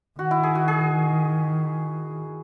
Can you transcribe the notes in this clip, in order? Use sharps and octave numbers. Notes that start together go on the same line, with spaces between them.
D#3 F#4
E4
G#4
F#4
G#4